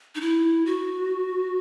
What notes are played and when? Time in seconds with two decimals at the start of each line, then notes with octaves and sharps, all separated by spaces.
0.15 D#4
0.21 E4
0.66 F#4